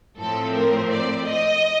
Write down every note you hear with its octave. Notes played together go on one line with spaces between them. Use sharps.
A2 F3 C4 A4
A#4
D5
D#5